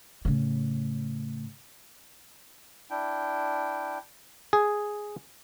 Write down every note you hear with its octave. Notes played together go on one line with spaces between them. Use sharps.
A2 C#3
D4 E4 G5
G#4